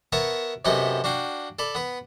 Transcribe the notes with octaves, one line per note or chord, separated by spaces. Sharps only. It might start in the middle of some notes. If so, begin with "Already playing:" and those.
B3 A#4 C#5 E5 A5 A#5
F#2 C3 B3 E4 A4 D#5
D4 F#4 F5 G5
A4 D5 B5
B3 B4